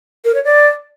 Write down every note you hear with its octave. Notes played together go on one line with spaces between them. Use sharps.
A#4
C#5
D5